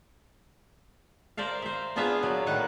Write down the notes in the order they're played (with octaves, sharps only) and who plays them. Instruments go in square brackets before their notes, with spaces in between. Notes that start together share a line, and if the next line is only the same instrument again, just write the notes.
[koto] A#4 C5 D5 E5 F5
C5 E5
B3 D4 F4 G#4 E5 F5
A#2 F#3
A2 D#3 A#3 B4 F#5